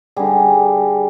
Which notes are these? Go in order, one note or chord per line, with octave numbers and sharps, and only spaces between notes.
D3 G3 G#4